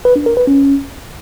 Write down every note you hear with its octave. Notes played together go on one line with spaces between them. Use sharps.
B4
D4
A#4
B4
C#4